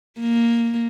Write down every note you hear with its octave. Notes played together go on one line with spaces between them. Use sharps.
A#3